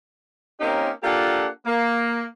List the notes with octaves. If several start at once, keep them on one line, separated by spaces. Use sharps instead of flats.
A#3 C4 C#4 D#4 G4 A#4
A#3 D4 F4 G4 A4 F#5
A#3